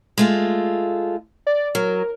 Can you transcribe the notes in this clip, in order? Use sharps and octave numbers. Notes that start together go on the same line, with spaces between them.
G#3 A3 F4
D5
F#3 A#4